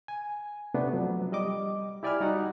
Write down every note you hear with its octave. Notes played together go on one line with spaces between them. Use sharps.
G#5
C3 A3 B3 D4
F3 F#3
G3 D#5 D6
E4 G4 D5 G#5 B5 F6
G3 D#4 F#4 F#5